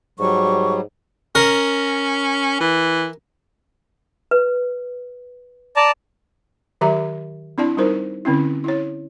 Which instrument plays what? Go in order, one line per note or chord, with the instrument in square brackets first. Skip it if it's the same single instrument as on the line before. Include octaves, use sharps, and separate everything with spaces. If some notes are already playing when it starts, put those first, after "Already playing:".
[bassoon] G#2 [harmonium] F#3 G3 [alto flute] C#6
[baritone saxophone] C#4 [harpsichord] A#4
[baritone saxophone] E3
[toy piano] B4
[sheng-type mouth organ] D5 A5 A#5
[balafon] D#3 F#3 G4 E5 A#5
C4 D4 E4 D5 A5
G3 D#4 F4 A#4 C5
D3 C4 C#4 E4
E4 C#5